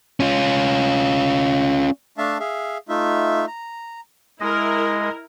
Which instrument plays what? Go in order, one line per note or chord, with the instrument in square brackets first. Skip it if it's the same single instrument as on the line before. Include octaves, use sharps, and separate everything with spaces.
[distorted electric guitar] C#4 F4
[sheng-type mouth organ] A3 D4 E5 F5 A5
G#4 E5 F5
A3 D#4 F4 E5
A#5
[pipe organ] G#3 D#5 [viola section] E4 A#4